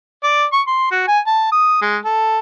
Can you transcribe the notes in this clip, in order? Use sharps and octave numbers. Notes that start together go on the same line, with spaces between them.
D5
C#6
C6
F#4
G#5
A5
D#6
G#3
A4